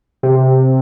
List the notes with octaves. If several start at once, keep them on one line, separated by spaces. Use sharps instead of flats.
C3